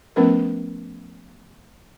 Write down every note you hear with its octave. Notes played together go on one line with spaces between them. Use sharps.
F3 A3 B3 C#4 A#4 B4